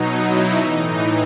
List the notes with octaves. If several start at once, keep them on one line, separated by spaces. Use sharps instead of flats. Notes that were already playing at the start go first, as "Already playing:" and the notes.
Already playing: B2 F#3 D#4
E4
A2 E3 D#4